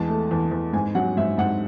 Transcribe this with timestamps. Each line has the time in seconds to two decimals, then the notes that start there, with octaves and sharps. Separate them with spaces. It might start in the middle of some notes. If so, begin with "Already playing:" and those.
Already playing: E2 G#3 A5
0.08 A3
0.31 E2
0.51 E2
0.73 G#2 G#5
0.95 F#3 F#5
1.17 G#2 E5
1.38 G#2 F#5